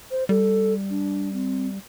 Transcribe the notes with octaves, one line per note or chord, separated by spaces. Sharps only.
C5
G3 A4
D4
C4